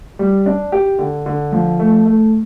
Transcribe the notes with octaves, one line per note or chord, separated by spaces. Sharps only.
G3
D4
G4
D3
D3
F3
A3
A3